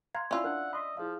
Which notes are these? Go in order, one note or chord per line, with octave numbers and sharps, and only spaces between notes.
F5 A#5 C6 F#6 G#6
C4 C#4 E4 F4 D5 E5 E6
D4 A#4 F#5
D#5 B5 C6 B6
F3 E4 G#4 F5